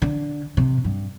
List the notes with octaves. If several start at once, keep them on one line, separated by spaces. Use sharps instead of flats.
D3
C3
G2